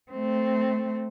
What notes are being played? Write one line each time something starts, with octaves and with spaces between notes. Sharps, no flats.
A3 C4